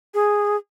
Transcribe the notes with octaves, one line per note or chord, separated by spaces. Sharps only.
G#4